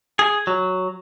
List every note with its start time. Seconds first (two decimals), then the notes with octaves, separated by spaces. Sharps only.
0.19 G#4
0.47 F#3